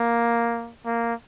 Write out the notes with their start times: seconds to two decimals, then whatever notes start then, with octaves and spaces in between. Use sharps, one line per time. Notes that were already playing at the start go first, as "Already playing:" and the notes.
Already playing: A#3
0.86 A#3